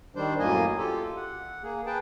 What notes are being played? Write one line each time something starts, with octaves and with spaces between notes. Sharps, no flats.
D#3 G3 D4 C5
F#2 A2 A#3 D#5 G#5
F4 G4 A4
F#5
A#3 G#4
G#4 B4 G5 A5